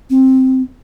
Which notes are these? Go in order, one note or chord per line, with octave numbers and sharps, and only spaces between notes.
C4